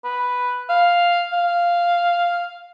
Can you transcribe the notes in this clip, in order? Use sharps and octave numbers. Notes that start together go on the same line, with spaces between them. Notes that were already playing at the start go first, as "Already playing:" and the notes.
B4
F5
F5